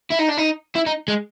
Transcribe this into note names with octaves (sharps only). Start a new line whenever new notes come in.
E4
D#4
D4
D#4
E4
D#4
G#3